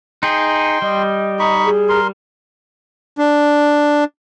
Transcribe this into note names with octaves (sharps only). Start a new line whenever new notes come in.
D#4 G#4 G5 C6
G3 D#5
D#4 B5 C#6
G#4
A#4 C6
D4